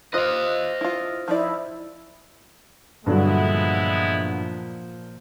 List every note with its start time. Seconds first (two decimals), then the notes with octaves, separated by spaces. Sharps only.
0.14 F4 C5 D#5 F5 F#6
0.81 E4 F4
1.28 F3 D#4 E4 D5
3.06 G2 A#2 D3 F3 F#3 G#3 B3 E4